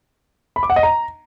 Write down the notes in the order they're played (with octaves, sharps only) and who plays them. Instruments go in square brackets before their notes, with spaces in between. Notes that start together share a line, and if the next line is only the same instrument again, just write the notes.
[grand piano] B5
D6
F#5
D#5
A#5